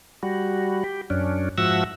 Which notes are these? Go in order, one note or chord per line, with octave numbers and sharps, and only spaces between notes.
G3 F#4
G4
F#2 C#4 D4
G#2 F3 F#4 E5 F#5 E6